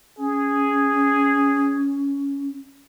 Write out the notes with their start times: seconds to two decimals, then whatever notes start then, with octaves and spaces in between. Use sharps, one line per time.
0.18 C#4 G#4